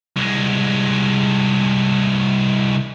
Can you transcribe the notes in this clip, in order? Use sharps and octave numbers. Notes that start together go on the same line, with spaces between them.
C2 G#3